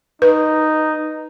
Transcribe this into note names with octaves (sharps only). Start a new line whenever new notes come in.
D#4 B4